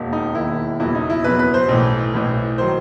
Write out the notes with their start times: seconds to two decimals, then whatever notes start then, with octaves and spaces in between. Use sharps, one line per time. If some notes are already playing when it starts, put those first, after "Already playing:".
Already playing: E1 D#2 D#3
0.13 D#4
0.35 E1 D#2 D#3 E4
0.80 F#1 E2 B2 F#3 E4
0.95 D#4
1.10 E4
1.24 F#1 E2 B2 F#3 B4
1.39 B4
1.54 C5
1.69 B1 A2 E3
2.14 B1 A2 E3
2.58 D#3 F#3 C5